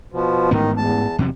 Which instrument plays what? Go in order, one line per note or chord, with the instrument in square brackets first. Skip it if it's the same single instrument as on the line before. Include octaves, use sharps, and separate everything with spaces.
[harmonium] B2 F3
[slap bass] A1 G#2 B3 [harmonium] D#3
[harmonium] E2 A5
[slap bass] E2 C3 F#3